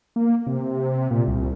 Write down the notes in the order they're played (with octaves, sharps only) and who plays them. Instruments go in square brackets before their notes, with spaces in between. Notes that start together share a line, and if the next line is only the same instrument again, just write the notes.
[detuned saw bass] A#3
C3
A#2
C2